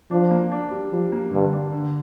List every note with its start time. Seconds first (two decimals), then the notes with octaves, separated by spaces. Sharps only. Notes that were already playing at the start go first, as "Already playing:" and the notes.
0.11 F3 D4
0.31 A#3
0.52 D4
0.71 G3
0.92 F3 G3
1.12 A#3
1.32 G2 D3
1.53 D4
1.72 D3